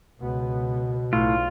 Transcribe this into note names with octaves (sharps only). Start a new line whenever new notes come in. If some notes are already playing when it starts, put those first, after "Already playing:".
C#2 B2 B3
B1 A2 F4